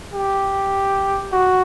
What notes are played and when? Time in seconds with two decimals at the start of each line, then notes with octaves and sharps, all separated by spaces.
0.14 G4
1.32 F#4